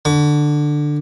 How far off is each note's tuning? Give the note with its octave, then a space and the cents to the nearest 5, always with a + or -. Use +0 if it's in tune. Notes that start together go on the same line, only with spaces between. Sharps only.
D3 +10 C#6 +45